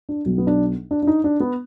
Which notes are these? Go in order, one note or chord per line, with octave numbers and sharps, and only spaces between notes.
D4
B1 B2 F#3
B3
D4
D4
D4
D#4
D4
B3